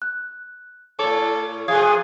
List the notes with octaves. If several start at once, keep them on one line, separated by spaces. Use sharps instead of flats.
F#6
A2 A4 C#5 D6
F2 C3 G#4 F5 D#6 G#6